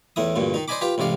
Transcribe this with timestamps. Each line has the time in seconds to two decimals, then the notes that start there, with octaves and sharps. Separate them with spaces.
0.16 E2 A2 E4 D#6
0.36 D2 G2 A#2
0.54 D#3 D#4
0.68 C5 D5 D#5 G#5 B5 D6
0.81 F4 G4 B4 G5
0.98 A1 G#2 C3 D5 F5